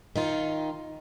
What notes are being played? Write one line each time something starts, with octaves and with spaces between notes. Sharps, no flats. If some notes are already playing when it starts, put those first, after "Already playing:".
D#3 D#4 F4